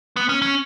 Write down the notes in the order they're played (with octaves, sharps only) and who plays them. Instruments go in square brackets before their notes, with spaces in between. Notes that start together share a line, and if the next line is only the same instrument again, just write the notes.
[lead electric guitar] B3
C#4
C#4